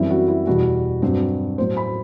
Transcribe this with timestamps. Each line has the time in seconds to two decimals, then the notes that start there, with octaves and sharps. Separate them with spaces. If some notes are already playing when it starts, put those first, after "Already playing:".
Already playing: F#2 E3 G3 C4 E4
0.10 F#4
0.28 E4
0.47 E2 B2 G3 F#4
1.02 G2 F#3 C4
1.58 A2 F#3 B3 C5
1.77 B5